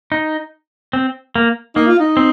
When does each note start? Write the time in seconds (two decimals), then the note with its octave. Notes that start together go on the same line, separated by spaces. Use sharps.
0.12 D#4
0.93 C4
1.35 A#3
1.75 A#3 D#4
1.87 F4
2.00 D#4
2.17 C4